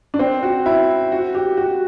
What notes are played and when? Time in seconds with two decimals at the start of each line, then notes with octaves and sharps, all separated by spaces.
0.14 D4
0.19 C4
0.43 F#4
0.66 E4
1.12 F#4
1.35 G4
1.57 F#4